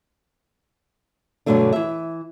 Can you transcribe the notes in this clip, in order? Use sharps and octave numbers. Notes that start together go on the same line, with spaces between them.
G2 B2 D3 F#3 A3 D4
E3 E5